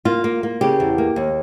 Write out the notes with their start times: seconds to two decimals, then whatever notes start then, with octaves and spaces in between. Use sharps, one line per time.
0.05 A#3 F4
0.24 A#3
0.43 A#3
0.61 C#3 G4
0.80 E2
0.98 A#3
1.16 D#2